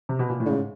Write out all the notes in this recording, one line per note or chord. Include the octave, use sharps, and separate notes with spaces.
C3
B2
A#2
A2
D3
G#2 C#3